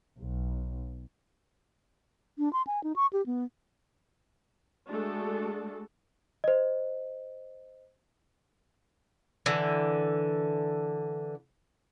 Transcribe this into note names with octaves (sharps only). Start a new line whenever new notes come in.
B1
D4
C6
G#5
D#4
C#6
G4
B3
G#3 A3 D4 F#4 G#4 A4
C5 D#5
D3 E3